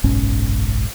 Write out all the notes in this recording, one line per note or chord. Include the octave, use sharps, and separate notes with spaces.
F#1 B1 G#2 C#4